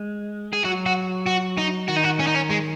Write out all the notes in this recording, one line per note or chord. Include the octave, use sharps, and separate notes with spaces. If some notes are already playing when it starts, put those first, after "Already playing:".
Already playing: G#3
G#4
F#3 F#4
F#4
F#4
D#4
D#3 F#4
D#4
F#4
C#4
D#4
C#4
G#3